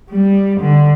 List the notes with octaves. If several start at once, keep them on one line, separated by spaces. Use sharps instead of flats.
G3
D3